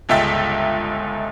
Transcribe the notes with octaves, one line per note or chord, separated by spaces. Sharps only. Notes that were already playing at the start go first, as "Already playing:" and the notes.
G1 C#2 G#3 E5 G5 A6